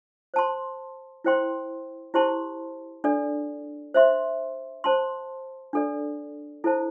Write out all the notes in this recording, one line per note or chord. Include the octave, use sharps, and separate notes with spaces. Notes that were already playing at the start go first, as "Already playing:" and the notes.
C5 A5 C6
E4 C5 G5 C6
E4 G4 C5 A5 C6
D4 A4 D5
C5 E5 C6
C5 A5 C6
D4 A4 D5
E4 A4 C5 A5